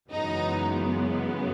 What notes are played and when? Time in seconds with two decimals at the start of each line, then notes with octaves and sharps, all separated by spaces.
0.10 F#2 C#3 E3 G#3 B3 D#4